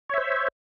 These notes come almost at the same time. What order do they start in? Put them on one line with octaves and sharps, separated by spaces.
C#5 E5 C5